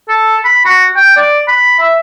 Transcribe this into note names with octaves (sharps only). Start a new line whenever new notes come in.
A4
B5
F#4
G5
D5
B5
E5